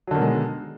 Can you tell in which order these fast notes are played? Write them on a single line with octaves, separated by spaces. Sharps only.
F#3 D3 D#3 B2 G#3